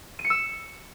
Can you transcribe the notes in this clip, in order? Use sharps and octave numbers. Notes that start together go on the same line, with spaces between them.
D#7
C#7
E6